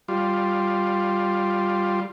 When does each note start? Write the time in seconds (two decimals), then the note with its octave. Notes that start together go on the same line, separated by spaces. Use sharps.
0.08 G3 F4